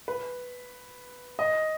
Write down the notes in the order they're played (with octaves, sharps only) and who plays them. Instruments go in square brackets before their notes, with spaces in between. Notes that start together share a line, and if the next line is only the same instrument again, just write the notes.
[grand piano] B4
D#5